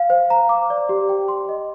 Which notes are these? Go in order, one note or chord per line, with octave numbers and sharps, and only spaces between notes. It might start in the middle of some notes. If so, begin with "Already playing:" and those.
Already playing: F5
C5
A#5
D6
D5
G4
G5
C6
D#5